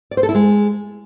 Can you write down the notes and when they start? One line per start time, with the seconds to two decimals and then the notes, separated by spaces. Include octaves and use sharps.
0.11 D5
0.17 C5
0.23 A4
0.29 E4
0.35 G#3